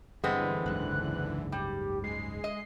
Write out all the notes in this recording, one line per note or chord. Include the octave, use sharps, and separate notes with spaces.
G2 D3 E3 G#3 B3 C4
F#1 C#2 G#2 F#6
G3 G4
G#3 C7
D#5